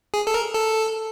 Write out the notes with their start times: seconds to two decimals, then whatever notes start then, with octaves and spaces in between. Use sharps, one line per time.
0.14 G#4
0.27 A4
0.34 A#4
0.55 A4